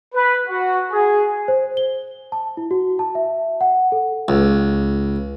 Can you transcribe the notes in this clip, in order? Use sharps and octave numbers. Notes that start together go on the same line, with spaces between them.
B4
F#4
G#4
C5
G7
A5
E4
F#4
A5
E5
F#5
A4
C#2